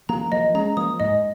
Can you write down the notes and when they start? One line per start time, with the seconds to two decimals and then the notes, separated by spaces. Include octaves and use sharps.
0.09 F3 A#3 A#5
0.32 F3 A#3 D#5
0.54 G#3 C#4 A#5
0.77 F3 A#3 D#6
1.00 G#2 D#5